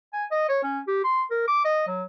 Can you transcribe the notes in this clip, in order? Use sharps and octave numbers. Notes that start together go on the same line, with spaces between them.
G#5
D#5
C#5
C#4
G4
C6
A#4
D6
D#5
F#3